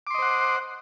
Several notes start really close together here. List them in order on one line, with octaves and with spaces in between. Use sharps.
D6 C6 D#5 C5 F#5